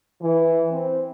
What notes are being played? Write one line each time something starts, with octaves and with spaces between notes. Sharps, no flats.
E3
C4